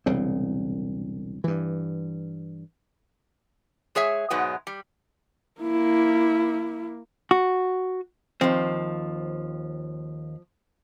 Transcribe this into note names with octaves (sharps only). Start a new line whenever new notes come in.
E1 C2 C#3 C4
G2 E3
G#3 G#4 C#5 E5
G#2 B2 F#3 G#3 B3
G3
A#3 E4
F#4
D#2 F3 C4